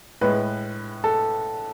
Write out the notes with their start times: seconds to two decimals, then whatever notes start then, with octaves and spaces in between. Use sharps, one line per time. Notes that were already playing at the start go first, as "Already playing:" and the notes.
0.21 A2 G#3 B4
1.04 A4